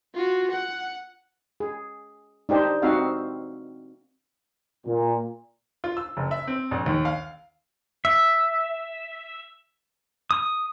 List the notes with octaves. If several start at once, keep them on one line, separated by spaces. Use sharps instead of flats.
F4 F#4
F#5
G#4
D4 D#4 G4 C5
C4 D#4 F#4 E5 F5
A#2
F4
E6
F#1
E5
C4
A#1
D#2
F5
E5
D#6